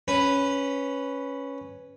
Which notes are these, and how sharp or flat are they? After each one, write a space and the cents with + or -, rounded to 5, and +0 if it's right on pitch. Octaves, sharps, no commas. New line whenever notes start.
C#4 +0 B4 +0